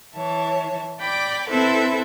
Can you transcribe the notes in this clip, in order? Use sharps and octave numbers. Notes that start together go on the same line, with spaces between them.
E3 C#5 E5 A5
D5 G5 B5 D6
C4 E4 A4 B4 C5 E5